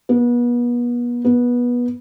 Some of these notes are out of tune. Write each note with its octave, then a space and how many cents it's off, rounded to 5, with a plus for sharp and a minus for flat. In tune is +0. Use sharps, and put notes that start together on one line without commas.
B3 -35
B3 -20